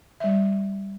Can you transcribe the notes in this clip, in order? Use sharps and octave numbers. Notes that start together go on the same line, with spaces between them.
G3 E5